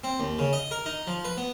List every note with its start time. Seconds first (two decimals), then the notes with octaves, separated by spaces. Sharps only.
0.04 C4
0.20 D#2
0.38 C#3
0.53 D#5
0.71 A#4
0.86 D#4
1.07 F3
1.25 B4
1.37 B3